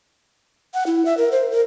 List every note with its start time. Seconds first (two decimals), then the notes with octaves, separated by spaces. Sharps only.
0.74 F#5
0.87 E4
1.05 E5
1.17 A#4
1.32 C5
1.51 A#4